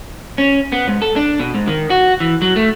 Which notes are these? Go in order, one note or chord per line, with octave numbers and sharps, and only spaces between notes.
C#4
B3
G#2
A4
D4
B2
G#2
D#3
F#4
E3
F#3
A3